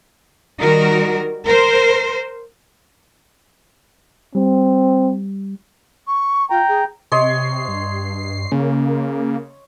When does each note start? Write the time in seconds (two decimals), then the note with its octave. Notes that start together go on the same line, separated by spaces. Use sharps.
0.59 D#3 G3 F#4 A#4
1.46 A#4 C5
4.35 G3 C4
6.07 C#6
6.50 F4 G5 A#5
6.68 G#4
7.12 C3 C#5 D#5 C6 C7
7.68 G2
8.52 C#3 A#3